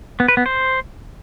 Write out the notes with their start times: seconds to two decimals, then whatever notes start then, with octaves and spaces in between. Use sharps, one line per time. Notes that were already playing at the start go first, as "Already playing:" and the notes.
0.20 B3
0.28 B4
0.37 B3
0.46 C5